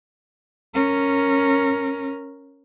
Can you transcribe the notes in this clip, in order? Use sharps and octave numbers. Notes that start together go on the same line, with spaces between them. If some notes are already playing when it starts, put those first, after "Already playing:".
C#4 A#4